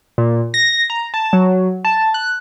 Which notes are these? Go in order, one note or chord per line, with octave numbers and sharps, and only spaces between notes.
A#2
A#6
A#5
A5
F#3
A5
F#6